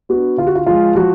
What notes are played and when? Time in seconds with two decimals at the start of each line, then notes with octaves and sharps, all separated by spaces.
0.09 B3 D4 F#4
0.37 D3 F4
0.47 F#4
0.55 F4
0.66 F3 G#3 F4
0.95 F3 F#4